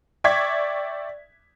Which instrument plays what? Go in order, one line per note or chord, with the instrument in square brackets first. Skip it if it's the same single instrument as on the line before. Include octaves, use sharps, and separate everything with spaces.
[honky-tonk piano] D5 E5 G5 C#6 G#6 B6